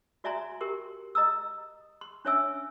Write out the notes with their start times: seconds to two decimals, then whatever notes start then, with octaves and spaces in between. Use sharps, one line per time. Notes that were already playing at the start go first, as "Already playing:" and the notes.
0.24 F#4 D5 E5 G#5 A#5 C6
0.61 G4 A#4 G5 C6
1.15 D#5 A#5 D#6 E6
2.01 C6
2.25 C#4 D4 C#5 E5 G#5 E6